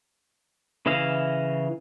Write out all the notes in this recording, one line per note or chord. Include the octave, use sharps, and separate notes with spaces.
C#3 E3 E4 D#5 F5